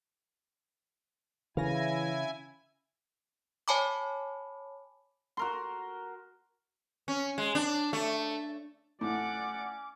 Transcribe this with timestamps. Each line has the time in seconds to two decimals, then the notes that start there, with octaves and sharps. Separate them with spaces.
1.57 C#3 E3 E4 F5 G#5 A#6
3.68 C#5 G#5 A5 B5 D6
5.37 F#4 A#4 C6
7.08 C#4
7.38 G#3
7.55 D4
7.93 A3
9.01 A2 C#4 D5 F#5 D6